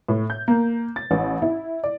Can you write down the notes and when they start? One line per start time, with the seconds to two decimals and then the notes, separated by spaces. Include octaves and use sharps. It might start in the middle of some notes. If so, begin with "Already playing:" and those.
0.08 A2
0.30 G6
0.48 A#3
0.96 A6
1.11 A1
1.42 E4
1.84 D5